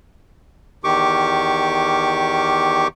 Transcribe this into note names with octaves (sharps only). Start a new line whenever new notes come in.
E2 D#3 G4 C#6 D6